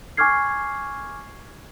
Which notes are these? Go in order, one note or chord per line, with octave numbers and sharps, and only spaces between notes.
G#5 C#6 D6 F6 G#6 C7